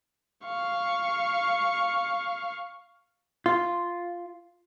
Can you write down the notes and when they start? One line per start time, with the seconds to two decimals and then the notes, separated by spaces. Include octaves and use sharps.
0.45 F5 C#6
3.46 F4